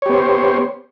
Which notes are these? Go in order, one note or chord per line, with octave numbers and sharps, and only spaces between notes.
B3 G4 C5 C#5